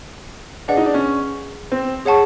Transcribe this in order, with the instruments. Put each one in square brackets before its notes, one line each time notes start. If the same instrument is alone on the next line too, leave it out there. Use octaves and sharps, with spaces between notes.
[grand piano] D4 [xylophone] G#4 B4 D#5 F#5
[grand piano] D#4
D4
C#4
C4
[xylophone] G#4 C#5 F#5 A5 C#6